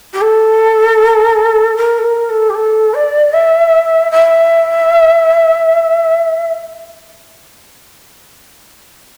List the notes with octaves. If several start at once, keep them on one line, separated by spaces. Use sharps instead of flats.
G4
A4
A#4
A4
A#4
A4
G4
A4
D5
E5
E5